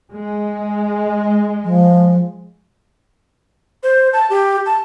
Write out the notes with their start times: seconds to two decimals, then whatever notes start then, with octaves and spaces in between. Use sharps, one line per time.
0.11 G#3
1.64 F3
3.83 C5
4.13 A5
4.30 G4
4.66 A5